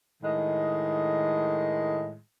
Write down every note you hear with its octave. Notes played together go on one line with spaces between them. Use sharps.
A2 D#3 G#3